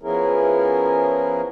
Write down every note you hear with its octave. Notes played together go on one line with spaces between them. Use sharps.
F3 B3 C#4 E4 G#4 A#4